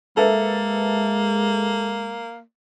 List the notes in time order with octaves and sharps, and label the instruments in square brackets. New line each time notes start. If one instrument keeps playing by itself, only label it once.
[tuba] G#3 [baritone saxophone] A#3 [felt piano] A4 B4 E5